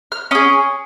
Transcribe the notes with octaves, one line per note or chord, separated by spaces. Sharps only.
F6
C#4 G#4 D#6